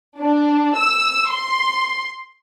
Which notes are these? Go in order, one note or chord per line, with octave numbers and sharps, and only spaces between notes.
D4
E6
C6